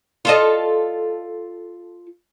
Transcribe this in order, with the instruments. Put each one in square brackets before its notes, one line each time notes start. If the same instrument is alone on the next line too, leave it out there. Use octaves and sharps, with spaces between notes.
[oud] F4 A4 D#5